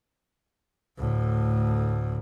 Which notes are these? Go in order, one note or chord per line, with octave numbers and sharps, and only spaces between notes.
D2 A2